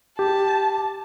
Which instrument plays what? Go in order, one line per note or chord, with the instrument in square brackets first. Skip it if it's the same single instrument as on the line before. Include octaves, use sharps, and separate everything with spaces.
[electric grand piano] G4 [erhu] A5